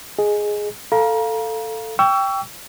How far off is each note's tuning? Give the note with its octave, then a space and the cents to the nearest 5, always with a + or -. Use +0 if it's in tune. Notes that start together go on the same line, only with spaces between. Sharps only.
G#4 +0 D#5 +0
A4 +10 F5 +0 A#5 +35
G5 +5 C#6 +30 E6 +20